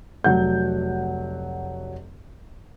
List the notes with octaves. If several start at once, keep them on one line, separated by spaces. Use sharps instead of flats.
F1 F#3 F#5 G6